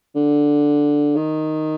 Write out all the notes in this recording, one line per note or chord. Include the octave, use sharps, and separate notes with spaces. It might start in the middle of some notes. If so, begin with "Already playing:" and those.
D3
D#3